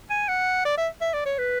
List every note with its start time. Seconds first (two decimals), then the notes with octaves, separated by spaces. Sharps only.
0.10 G#5
0.29 F#5
0.65 D5
0.77 E5
1.01 E5
1.14 D5
1.26 C#5
1.39 B4